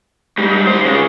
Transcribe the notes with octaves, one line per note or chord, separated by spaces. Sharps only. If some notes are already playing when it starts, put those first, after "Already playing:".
G#2 G3
D#3 C5
C#3 G#3